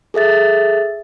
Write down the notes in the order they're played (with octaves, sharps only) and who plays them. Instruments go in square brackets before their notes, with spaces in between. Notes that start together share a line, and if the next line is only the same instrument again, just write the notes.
[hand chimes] G#4 A4 E5 A6